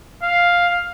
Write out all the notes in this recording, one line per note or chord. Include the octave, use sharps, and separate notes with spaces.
F5